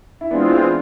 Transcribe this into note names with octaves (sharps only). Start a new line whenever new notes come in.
E4
E3 G#3 B3 C4 D4 F4